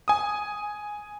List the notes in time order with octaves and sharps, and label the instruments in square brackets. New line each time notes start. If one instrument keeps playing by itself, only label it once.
[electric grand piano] G#5 D#6